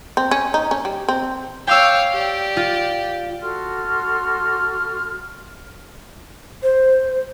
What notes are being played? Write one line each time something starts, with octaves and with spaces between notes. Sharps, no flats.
C4
C#4
D#4
C#4
G3
C4
C#5 F5 G5 D6 E6
G4 D5
F4
F#4 A4 C6 F6
C5